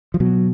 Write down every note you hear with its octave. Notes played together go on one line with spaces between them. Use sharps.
F3
B2 F#3